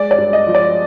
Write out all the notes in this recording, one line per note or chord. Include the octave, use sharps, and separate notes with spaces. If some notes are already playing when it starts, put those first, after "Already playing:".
Already playing: G#3 D5
D5
G2
D#5
F3
D5